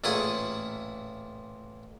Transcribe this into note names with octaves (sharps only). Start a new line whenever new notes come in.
A1 A#2 G#4 F#5 C#6 D#6